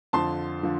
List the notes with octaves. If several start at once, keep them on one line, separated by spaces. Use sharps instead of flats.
F2 D3 F3 A5 C6
D3 F3